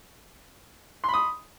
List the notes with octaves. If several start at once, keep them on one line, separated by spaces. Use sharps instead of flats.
B5 C6 D#6